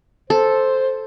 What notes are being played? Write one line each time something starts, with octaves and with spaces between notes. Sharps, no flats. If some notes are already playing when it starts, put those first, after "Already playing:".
A4 C5